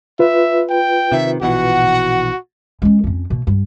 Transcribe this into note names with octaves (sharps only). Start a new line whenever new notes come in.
F4 B4 E5
G5
C3 D#3 E5
A#1 B2 E3 F#4 F#5
G#3 C#4
F2 C#4
B2 A#3
G2